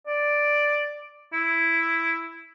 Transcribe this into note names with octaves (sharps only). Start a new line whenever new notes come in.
D5
E4